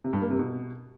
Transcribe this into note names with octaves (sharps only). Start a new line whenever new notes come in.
C3
G2
A#3
C3
B2